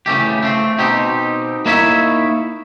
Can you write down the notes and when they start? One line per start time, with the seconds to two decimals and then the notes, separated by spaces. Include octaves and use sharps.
0.06 C#3 E3 A3 G4
0.43 A3 C4
0.78 B2 C4 D#4 G4
1.66 A#3 D#4 E4 C#5 E5